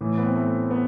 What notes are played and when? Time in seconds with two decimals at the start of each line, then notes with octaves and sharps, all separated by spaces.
0.01 A2 E3
0.18 B3
0.27 C4
0.36 A3
0.71 B3